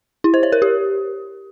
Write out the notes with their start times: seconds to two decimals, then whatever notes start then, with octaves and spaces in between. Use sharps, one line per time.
0.24 E4
0.34 C5
0.43 C#5
0.52 A#4
0.62 G4